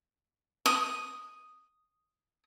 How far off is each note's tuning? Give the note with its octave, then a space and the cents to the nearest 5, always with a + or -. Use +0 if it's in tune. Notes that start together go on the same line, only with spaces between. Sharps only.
D#6 +0